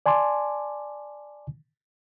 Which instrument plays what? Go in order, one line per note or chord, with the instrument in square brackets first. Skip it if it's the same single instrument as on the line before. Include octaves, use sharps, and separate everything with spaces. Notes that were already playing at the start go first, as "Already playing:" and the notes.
[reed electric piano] D5 G#5 A5 C6 D6